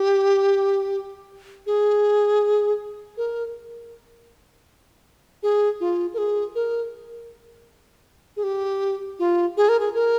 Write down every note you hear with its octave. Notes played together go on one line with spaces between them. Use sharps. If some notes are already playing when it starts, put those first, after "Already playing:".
Already playing: G4
G#4
A#4
G#4
F4
A#4
G#4
A#4
G#4
G4
F4
G#4
A#4
G#4
A#4